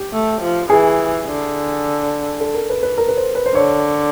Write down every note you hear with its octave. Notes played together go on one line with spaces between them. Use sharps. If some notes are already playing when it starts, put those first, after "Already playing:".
Already playing: G4
A3
F3
E3 G#4
D3
A4
A#4
B4
B4
A#4
B4
C5
B4
C5
D3 C#5